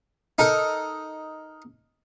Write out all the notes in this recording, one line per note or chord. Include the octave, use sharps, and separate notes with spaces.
D#4 A4 A#4